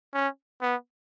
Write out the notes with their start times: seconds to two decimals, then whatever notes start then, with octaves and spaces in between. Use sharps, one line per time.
0.14 C#4
0.61 B3